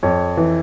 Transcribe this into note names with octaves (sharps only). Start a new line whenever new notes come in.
F2 C#5
E3